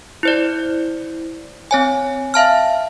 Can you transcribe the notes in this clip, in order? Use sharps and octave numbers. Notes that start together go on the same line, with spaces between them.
E4 C5 D5
C4 C#5 G#5
E5 F5 A5 F6